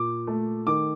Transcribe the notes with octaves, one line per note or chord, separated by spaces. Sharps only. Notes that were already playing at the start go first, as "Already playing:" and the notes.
Already playing: A#2 D6
A3
D#3 D6